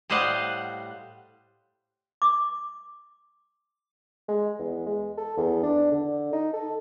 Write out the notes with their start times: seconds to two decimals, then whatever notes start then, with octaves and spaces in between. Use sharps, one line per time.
0.10 A2 G3 C5 D#5 F5 F#5
2.22 D6
4.29 G#3
4.59 E2
4.86 G#3
5.17 A4
5.37 E2
5.63 D4
5.92 D3
6.33 D#4
6.53 A4